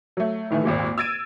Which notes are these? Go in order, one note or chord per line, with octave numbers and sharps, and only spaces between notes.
F#3 A3
A2 D#3 E3 A3
G#1 D#2 A#2 G#3
E6 G#6 A6 D7 D#7